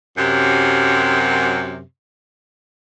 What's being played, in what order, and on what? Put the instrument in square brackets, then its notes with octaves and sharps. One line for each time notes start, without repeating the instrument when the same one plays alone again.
[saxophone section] F#2 C3